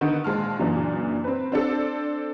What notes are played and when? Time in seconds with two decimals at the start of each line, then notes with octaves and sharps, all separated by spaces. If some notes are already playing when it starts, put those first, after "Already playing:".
0.01 D3 D#3 B3 D#4
0.24 A#1 G#3 A5 F6
0.59 F#2 A#2 C#3 E3 D4
1.24 C4 B4
1.52 C4 D4 A4